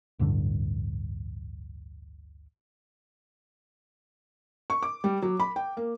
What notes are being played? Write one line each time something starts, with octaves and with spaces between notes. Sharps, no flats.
D1 A1 G2 D3
C#6
D6
G3
F#3
B5
G5
A#3